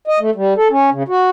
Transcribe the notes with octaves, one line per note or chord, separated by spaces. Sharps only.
D#5
A3
G3
A4
C#4
C#3
F#4